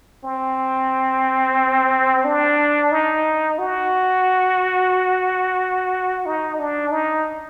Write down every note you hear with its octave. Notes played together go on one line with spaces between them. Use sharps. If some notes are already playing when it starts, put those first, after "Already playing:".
C4
D4
D#4
F#4
D#4
D4
D#4